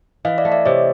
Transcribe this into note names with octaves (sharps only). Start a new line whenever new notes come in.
E3 D#5 F5
D5 E5
A3
D5 E5
C3 C#5 D#5